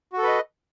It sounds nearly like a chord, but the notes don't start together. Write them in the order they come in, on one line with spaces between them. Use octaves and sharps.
F#4 A4 B4 D#5